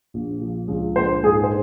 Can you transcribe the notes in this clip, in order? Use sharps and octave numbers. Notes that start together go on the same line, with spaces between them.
A#1
F3
C#2
A#1 C5
G#2 G#4
C5